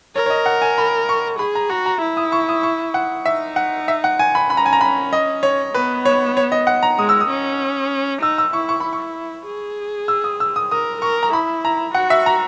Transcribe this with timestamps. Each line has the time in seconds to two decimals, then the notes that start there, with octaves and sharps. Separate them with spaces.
0.16 A#4 C#5
0.26 C#5
0.30 D#5
0.46 F#5
0.62 G#5
0.78 B5
1.09 C#6
1.39 G#4 B5
1.55 A#5
1.70 F#4 A#5
1.86 A#5
2.02 E4
2.17 D#6
2.32 C#6
2.49 D#6
2.63 C#6
2.94 F#5
3.26 D#4 E5
3.56 F#5
3.88 E5
4.04 F#5
4.19 G#5
4.35 B5
4.50 C#4 B5
4.57 A#5
4.66 G#5
4.73 A#5
4.81 B5
5.13 D#5
5.43 C#5
5.74 B3 B4
6.05 C#5
6.37 C#5
6.52 D#5
6.67 F#5
6.83 A#5
6.99 G#3 D#6
7.09 E6
7.21 D#6
7.30 C#4
8.22 D#4 E6
8.38 E6
8.53 E4 C#6
8.69 C#6
8.80 E4 B5
8.93 C#6
9.47 G#4
10.08 E6
10.24 D#6
10.40 E6
10.56 D#6
10.71 A#4 D#6
11.02 A#4 C#6
11.23 A#5
11.33 E4 B5
11.65 A#5
11.94 F#4 F#5
12.10 E5
12.26 A#5